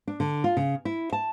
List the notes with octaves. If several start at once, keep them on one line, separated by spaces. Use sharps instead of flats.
D4
D3
F4
C#3
E4
A5